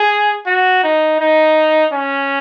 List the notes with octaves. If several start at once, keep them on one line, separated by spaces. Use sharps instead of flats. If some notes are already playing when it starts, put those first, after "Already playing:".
Already playing: G#4
F#4
D#4
D#4
C#4